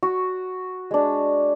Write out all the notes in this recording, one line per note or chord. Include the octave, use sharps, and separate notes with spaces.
F#4
G#3 D4